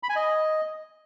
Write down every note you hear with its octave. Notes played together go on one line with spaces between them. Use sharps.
B5
G#5
D#5